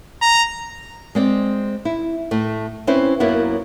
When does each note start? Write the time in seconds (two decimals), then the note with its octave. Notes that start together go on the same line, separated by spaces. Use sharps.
0.22 A#5
1.15 G#3 C4 D5
1.85 E4
2.31 A2 A3
2.87 C4 C#4 E4 B4 C5
3.20 F#2 F#3 A#3 B3 E4